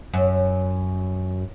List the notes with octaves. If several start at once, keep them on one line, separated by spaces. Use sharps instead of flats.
F#2